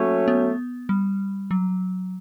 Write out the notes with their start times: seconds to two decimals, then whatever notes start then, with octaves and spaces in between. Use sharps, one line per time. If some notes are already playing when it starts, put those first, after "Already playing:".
Already playing: F#3 A3 A#3 C#4
0.28 B3
0.89 G3
1.51 F#3